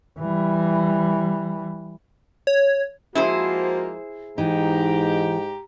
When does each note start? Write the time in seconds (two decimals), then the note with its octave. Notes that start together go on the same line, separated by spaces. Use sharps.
0.19 E3 G3
2.47 C#5
3.15 F3 G#3 A#3 E4 F#4 G#4 C5
4.38 G#2 E3 D#4 G4 A#5